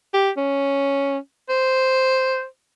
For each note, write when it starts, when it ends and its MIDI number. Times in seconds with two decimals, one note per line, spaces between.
0.14 0.30 67
0.37 1.18 61
1.49 2.44 72